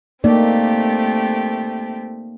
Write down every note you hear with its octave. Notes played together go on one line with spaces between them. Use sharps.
A3 A#3 C4 D#4 G4 D5